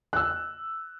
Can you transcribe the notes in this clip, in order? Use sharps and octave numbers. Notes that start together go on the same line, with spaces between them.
E6 F#6